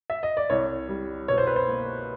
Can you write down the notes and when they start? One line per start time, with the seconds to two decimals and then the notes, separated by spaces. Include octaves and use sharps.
0.10 E5
0.23 D#5
0.37 D5
0.50 C2 C#5
0.89 G3
1.28 B2 C#5
1.38 C5
1.47 B4
1.56 C5
1.68 A#3